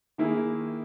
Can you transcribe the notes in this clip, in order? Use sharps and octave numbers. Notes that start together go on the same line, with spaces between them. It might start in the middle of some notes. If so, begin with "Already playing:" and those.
D#3 A#3 E4 G#4